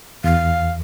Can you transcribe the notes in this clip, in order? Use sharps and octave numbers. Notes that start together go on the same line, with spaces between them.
E2 F5